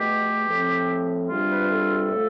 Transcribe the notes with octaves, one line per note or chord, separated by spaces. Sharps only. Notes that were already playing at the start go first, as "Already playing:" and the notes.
Already playing: E2 B2 A3 G4
A2 F3 C4
E2 C3 G3 D4 F4
B4
A4
A2 F3 A3